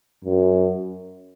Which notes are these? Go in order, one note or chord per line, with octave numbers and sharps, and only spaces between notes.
F#2